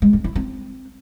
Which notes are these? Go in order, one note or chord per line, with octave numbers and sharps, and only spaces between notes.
G#3
C4
E4
C4